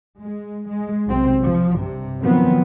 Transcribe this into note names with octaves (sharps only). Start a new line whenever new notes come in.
G#3
G#3
B1 C3 C4
F3
G2 C3
D#3 F3 F#3 B3 C4